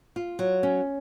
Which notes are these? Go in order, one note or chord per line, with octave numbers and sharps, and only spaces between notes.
F4
F#3
C#4